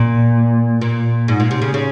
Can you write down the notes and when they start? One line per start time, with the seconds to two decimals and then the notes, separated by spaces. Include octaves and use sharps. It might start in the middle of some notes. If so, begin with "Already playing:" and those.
Already playing: A#2
0.81 A#2
1.28 G#2
1.40 A#2
1.51 C3
1.62 C#3
1.74 C#3